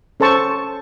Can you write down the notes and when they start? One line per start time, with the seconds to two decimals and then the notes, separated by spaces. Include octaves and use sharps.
0.20 C#4 A4 C5 A5 C#6